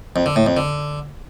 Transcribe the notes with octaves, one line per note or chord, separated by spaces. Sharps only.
F2
D3
A2
F2
D3